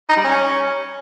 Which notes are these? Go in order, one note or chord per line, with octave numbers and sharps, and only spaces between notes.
D#4
G3
C#4